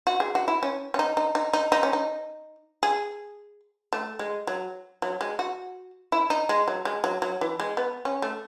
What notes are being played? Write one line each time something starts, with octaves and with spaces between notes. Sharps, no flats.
F#4
G#4
F#4
E4
C#4
C#4
D#4
D#4
D#4
D#4
D#4
C#4
D#4
G#4
A3
G#3
F#3
F#3
G#3
F#4
E4
D#4
G#3
F#3
G#3
F#3
F#3
E3
G#3
B3
C#4
A3